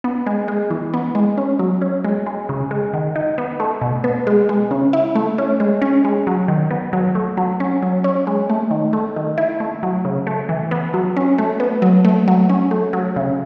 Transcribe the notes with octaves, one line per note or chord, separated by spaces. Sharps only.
B3
G#3
G#3
E3
B3
G#3
C#4
F#3
C#4
G#3
G#3
C#3
G#3
D#3
D#4
B3
A3
B2
B3
G#3
G#3
C#3
E4
A3
C#4
G#3
C#4
G#3
F#3
D#3
B3
F#3
A3
F#3
C#4
F#3
C#4
G#3
A3
D#3
A3
D#3
E4
A3
F#3
C#3
A3
E3
B3
F#3
C#4
A3
B3
F#3
A3
F#3
C#4
A3
F#3
C#3